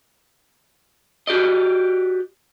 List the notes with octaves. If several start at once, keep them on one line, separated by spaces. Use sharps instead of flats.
F#4 G4 D5 D#5